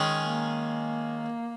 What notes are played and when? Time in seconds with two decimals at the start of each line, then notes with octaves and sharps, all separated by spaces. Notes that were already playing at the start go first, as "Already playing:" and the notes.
Already playing: D#3 G#3 C#4 G#4 C#5
0.25 A#3